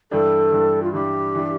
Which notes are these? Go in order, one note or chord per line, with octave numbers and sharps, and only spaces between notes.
G2 E3 G3 D4 A4
G2 E3 G3 D4
F4
G2 E3 G3 D4 G4
E3 G3 D4